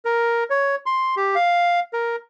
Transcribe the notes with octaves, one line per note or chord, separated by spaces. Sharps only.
A#4
C#5
C6
G4
F5
A#4